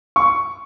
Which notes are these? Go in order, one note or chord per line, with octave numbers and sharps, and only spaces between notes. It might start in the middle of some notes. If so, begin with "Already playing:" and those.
C#6